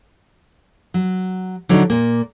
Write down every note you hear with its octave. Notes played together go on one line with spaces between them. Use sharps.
F#3
D3 F#3 D4 D#4
A#2 A#3